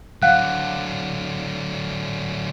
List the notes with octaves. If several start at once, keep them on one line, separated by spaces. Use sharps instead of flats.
D3 F#3 F5 F#5 F#6